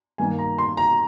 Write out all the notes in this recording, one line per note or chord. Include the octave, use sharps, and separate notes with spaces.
G2 D#3 A#3 G#5
A#5
C6
A#5